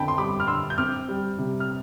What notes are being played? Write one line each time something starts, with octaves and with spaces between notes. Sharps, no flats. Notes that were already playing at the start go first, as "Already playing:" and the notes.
Already playing: F2 D3 C4 G5 A5 B5
C6
G3 B5 D6
F6
D3 C6 E6
G6
C4 D6 F6
G3
C3
F6